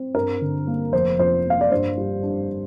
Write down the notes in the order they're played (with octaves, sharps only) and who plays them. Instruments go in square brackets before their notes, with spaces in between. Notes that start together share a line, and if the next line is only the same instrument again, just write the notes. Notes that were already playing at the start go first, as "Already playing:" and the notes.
Already playing: [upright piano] C4
G2 A#4
D3
A#3
F1 C5
F2 C5
A#3
F5
D5
G2 C5
G3
D4